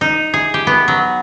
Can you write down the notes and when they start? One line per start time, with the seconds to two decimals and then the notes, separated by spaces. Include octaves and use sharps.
0.01 D#4
0.34 G#4
0.54 G4
0.67 B3
0.88 F#3